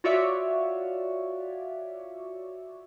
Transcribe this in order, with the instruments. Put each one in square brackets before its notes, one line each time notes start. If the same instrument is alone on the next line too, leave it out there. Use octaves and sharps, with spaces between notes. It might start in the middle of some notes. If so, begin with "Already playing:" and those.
[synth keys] F4 F#4 C#5 D5 E5